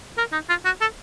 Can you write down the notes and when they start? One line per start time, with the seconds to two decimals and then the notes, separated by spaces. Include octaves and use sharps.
0.18 A#4
0.33 D#4
0.49 F4
0.65 F#4
0.81 A4